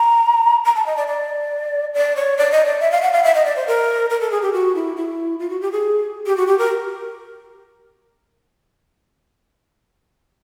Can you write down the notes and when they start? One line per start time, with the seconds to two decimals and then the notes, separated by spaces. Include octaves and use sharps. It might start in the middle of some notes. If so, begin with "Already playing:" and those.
Already playing: A#5
0.65 A#5
0.76 A5
0.86 D#5
0.97 D5
1.08 D5
1.94 D5
2.16 C#5
2.37 D5
2.52 D#5
2.66 D5
2.80 E5
2.92 F5
3.02 F#5
3.13 F5
3.24 E5
3.35 D#5
3.45 D5
3.56 C5
3.67 A#4
4.10 A#4
4.21 A4
4.31 G#4
4.42 G4
4.53 F#4
4.75 E4
4.97 E4
5.40 F4
5.50 F#4
5.61 G4
5.72 G#4
6.26 G4
6.37 F#4
6.47 G4
6.58 A#4